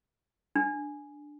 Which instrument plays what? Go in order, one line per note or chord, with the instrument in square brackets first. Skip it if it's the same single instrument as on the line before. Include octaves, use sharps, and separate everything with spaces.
[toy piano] D4